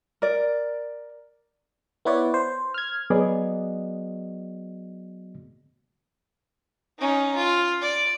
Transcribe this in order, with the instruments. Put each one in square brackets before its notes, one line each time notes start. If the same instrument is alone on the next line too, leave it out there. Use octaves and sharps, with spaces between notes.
[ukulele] A#4 D5
[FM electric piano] B3 E4 B4 C#5 D5
C5
F6 G#6
[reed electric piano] F#3 B3 F#4 G#4 D5 D#5
[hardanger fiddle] C#4 D#4
F4
D5